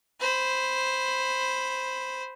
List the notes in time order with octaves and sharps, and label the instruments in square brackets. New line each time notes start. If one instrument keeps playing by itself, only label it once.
[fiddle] C5 B5